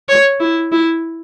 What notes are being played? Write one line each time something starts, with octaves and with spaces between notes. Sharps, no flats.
C#5
E4
E4